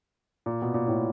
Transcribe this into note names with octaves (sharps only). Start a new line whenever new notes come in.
A#2
B2
A#2
A2